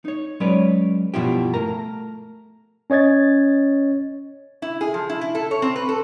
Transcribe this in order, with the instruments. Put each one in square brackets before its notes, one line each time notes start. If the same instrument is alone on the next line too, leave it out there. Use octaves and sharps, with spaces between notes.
[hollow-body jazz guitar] D#4 C#5
F#3 G#3 C#4 B4 C#5 D5
G2 B2 F3 E4 G4
A3 A#4 A#5
[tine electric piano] C#4 C#5 D#5 G#6 A6
[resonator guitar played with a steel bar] E4
G#4
F3
E4
E4
A4
C#5
C4
B4
A4